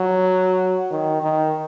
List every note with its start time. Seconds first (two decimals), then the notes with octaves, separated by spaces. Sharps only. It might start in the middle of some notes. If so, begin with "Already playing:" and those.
Already playing: F#3
0.91 D#3
1.22 D#3